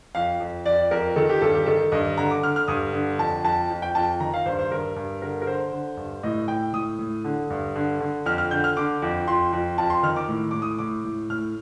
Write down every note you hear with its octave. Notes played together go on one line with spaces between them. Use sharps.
F2 F5
F2
F2 D5
F2 A#4
D#3 A4
G4
G2 A4
G4
D#3 A4
G2 D#5
D3 A#5
D6
D3 F6
F6
G2 D#6
D3
F2 A5
F2 A5
F2
G5
F2 A5
D#3 A#5
F5
G2 C5
C5
G2 A#4
G2
D3 A#4
A#4
D3 C5
D3
G2
A2 D#5
A2 G5
A2 D#6
A2
D3
G2
D3
D3
F2 F6
F6
D3 G6
F6
D3 D6
F2
F2 C6
F2
F2 A5
C6
D#3 F6
D6
A2
A2 D6
D#6
A2 D6
A2
A2 F6